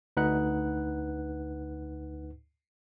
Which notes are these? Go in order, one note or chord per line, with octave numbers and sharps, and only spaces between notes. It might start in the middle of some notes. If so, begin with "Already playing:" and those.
D2 D#4 B4 F#5 F#6